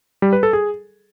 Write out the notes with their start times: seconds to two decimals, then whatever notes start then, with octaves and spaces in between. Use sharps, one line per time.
0.22 G3
0.33 B4
0.43 A4
0.53 G#4